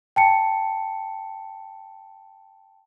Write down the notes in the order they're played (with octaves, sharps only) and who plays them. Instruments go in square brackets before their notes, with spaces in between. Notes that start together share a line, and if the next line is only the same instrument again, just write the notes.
[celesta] G5 A5 C#7